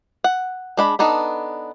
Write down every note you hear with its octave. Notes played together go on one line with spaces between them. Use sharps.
F#5
G#3 D4 B5
B3 D4 D#4 A4